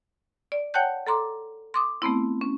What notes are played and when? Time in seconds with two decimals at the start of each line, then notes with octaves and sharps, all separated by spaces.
0.52 D5
0.74 C#5 F#5 G5 A5 F#6 G6
1.07 A4 A#5 C6 D6
1.74 C6 D6 D#6
2.02 A3 B3 C4 E4
2.41 C#4